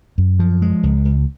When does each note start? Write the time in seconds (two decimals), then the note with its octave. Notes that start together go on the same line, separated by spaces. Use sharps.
0.18 F#2
0.39 F3
0.62 G#3
0.83 C#2
1.05 C#2